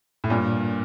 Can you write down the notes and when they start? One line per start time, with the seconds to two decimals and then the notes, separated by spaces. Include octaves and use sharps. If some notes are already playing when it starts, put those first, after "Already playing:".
0.24 A2
0.30 G2 A#2